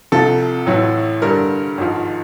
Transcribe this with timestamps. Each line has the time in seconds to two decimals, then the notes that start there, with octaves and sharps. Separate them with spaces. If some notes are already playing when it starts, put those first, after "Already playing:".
0.12 C2 C3 F3 A4
0.66 A1 A2 F#3
1.22 G2 D3 G3 A#4
1.78 G#1 G#2 F3